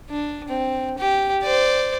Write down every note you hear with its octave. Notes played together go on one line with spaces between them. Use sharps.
D4
C4
G4
C5 D5